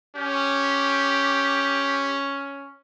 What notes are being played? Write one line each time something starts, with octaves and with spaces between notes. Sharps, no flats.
C#4 G4